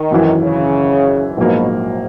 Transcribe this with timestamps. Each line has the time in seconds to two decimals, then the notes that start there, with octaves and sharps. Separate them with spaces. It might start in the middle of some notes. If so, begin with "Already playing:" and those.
Already playing: D#3
0.11 G#1 F#2 E3
0.43 C#3
1.37 A#1 G#2 B2 F#3 A#3